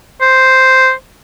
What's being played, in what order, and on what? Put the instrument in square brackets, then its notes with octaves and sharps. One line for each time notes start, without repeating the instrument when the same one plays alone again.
[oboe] C5